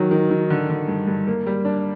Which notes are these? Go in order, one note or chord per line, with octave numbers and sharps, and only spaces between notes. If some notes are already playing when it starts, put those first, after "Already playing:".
Already playing: D#3 F#3
D#3
D#3
D3
D3
G2
G2
A#3
G3
D4